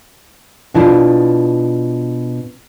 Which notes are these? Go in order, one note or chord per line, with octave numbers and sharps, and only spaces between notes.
B2 D4 E4 F4